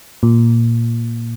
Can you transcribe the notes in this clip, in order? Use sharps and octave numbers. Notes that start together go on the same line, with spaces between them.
A#2